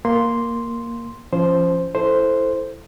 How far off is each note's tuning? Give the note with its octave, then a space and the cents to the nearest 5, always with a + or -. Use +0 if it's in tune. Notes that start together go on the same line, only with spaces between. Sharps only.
A#3 +0 C6 +0
F3 -25 C#4 +0 C5 +0
E4 +0 A4 +0 C5 +0